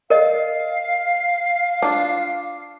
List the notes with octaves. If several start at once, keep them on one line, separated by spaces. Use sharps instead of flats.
A#4 D#5 F5
D4 F4